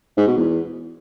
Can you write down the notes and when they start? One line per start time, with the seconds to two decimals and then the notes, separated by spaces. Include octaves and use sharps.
0.17 G#2
0.27 B2
0.37 E2